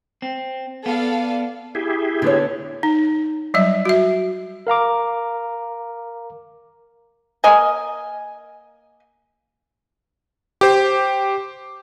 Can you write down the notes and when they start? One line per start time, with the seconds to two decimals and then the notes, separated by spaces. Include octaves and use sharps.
0.22 C4
0.86 B3 A4 D5 F5
1.75 E4 G4 G#4
2.22 D3 B3 C#5
2.83 D#4
3.54 F#3 G3 E5
3.85 F#4 E5
4.67 A#4 F5 A#5 D6
7.44 A#3 D#5 G#5
10.61 G4 C5